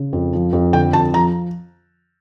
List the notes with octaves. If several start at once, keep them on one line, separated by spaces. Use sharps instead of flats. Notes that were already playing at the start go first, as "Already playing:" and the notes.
Already playing: C#3
F2
F3
F2
D3 G5
F2 A5
F3 A#5